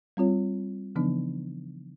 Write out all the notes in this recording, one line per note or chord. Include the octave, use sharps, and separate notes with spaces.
G3 C4 F4 C#5
C#3 E3 F3 B3 D4 D#4